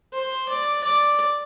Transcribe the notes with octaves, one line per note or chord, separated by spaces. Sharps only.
C5
D5
D5